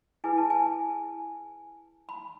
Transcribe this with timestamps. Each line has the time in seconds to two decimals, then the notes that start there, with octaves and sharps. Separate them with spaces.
0.24 E4 G#4 B4 G#5
0.37 A5
0.50 G#5
2.09 B5